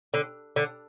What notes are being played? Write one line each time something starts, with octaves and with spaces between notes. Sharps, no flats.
D3
D3